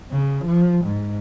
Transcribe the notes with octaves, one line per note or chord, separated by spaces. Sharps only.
C#3
F3
G#2